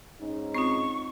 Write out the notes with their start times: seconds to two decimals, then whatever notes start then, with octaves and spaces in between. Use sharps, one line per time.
0.19 G#2 C#4 D#4
0.55 C4 F4 C#6